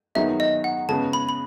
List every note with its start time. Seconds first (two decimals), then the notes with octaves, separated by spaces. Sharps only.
0.15 D#3 F#3 B3 D#4 G#4 E5
0.40 D#5
0.64 F#5
0.89 C#3 G#3 B3 A5
1.13 B5
1.29 B5